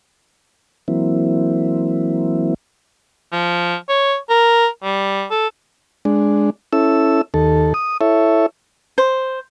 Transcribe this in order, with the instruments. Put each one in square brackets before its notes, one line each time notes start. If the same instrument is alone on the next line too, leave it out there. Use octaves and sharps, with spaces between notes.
[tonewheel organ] E3 F#3 A#3 C4 E4
[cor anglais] F3
C#5
A#4
G3
A4
[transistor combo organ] G#3 D4
C#4 E4 A4 E6
D#2 A4
D#6
E4 A4 C#5 E5
[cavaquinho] C5